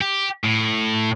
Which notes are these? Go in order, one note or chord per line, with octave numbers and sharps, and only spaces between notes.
G4
A2